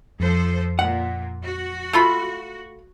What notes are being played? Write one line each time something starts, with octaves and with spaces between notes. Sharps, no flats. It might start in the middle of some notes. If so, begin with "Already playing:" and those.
F2 F3 A4 C5
A#2 F#5
F#4
A3 F4 B5